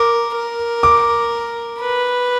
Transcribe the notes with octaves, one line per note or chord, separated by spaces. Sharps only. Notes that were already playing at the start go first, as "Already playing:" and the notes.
Already playing: A#4 D6
A#4
D6
B4